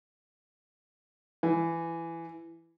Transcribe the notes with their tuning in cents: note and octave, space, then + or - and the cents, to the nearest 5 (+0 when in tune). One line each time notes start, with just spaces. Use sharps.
E3 +15